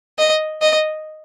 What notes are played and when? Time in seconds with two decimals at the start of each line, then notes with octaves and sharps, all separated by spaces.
0.19 D#5
0.62 D#5